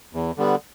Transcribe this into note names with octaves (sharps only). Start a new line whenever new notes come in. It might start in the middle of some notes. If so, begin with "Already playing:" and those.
E2
D3 G3 B3